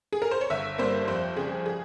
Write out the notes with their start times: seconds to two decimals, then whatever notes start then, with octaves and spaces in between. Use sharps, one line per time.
0.13 G#4
0.22 A#4
0.31 C5
0.41 C#5
0.50 G1 E5
0.78 G2 G3 A#3 C5
1.08 F2 C5
1.37 C#3 G3 G#4
1.66 G#4